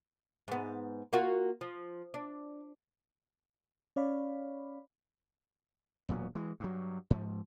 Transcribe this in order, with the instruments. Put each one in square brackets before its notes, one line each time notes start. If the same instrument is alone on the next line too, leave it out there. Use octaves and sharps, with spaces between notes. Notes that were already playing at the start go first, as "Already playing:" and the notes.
[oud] G#2 B3
A#3 F4 F#4
F3
D4
[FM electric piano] C#4 C#5 D5 F5 B5
[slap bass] E1 A#2 F#3 B3
E3 G#3
G2 F#3
G#2 F3